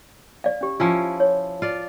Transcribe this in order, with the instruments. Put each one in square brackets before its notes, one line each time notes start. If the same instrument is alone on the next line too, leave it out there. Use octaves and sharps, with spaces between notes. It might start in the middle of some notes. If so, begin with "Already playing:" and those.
[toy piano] D5 F5
C#4 G4
[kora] F3 C#4 E4 [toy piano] F4
[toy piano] C#5
[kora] F4 D5